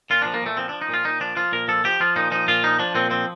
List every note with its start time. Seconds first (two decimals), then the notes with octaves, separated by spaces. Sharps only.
0.10 A#2 F4
0.22 F3 D4
0.34 A#3
0.42 A#2 A3
0.57 F3 C4
0.69 F3 D4
0.82 D#4
0.89 A#2 F4
1.05 A#2 D#4
1.20 F3 D4
1.36 F3 F4
1.52 A#2 A#4
1.68 F3 A4
1.84 F3 G4
2.00 F3 F4
2.16 A#2 D#4
2.31 F3 D#4
2.48 A#2 F4
2.63 F3 D#4
2.79 F3 D4
2.95 A#2 C4
3.11 F3 C4